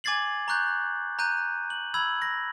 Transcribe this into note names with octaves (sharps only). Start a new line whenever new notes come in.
G#5 D6 G#6 A6 C7 F#7
A#5 C#6 F#6 G6
A#5 F#6 G6 D#7
F#7
B5 E6 G#6 F#7
A#6